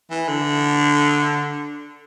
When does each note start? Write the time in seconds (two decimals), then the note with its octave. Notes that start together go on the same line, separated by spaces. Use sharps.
0.11 E3
0.28 D3